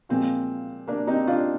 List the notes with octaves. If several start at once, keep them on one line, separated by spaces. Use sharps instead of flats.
A#2 F3 G#3 C4
A#3 D4
C4 D#4
D4 F4